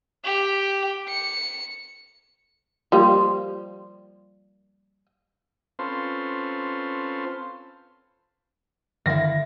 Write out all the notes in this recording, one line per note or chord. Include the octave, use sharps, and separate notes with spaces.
G4
C#7
F3 G3 A#3
C4 C#4 F4 A4 B4 C5
G2 D3 D#3 E4 F5 A#6